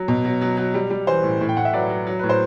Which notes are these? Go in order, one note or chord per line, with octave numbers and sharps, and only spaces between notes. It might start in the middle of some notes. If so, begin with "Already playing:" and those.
Already playing: F#3
B2
F#3
F#3
F#3
G3
G3
E3 C5
A2
A2
G5
A2 F#5
E5
F#3 B4 D5
F#3
F#3
A2 B4
C5